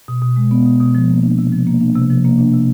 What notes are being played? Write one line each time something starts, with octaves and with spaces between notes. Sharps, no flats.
B2
B2
G#3
B3
B2
B2
F3
A#3
D4
C3
F3
A#3
D4
C3
F3
A#3
D4
C3